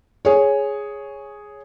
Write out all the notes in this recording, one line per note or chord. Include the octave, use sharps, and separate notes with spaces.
G#4 C#5